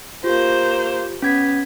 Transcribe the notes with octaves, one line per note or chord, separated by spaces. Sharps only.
A#3 F4 G4 C5
B3 C#4 G#6 B6